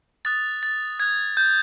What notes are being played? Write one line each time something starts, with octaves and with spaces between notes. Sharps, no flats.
D#6 F#6 A6
A6
D#6 F#6 G#6
G6